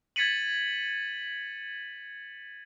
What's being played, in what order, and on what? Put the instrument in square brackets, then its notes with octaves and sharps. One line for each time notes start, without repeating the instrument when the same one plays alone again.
[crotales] G#6 A6 B6 C#7 D#7 F#7